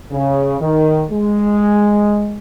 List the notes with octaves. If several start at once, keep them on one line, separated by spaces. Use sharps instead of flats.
C#3
D#3
G#3